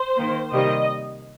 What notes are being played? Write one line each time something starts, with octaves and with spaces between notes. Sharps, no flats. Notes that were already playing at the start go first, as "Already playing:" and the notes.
Already playing: C5
D#3 A#3
C3 D#3 G3 A#3 D#5